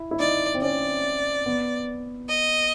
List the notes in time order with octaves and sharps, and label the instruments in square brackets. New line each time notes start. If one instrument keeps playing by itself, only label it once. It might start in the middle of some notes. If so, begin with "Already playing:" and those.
Already playing: [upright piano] E4
E4
[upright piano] D#4 [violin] D5
[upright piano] C4
[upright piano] C#4 [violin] D5
[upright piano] B3
[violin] D#5